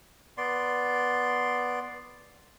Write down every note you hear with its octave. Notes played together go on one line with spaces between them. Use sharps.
B3 D5 C6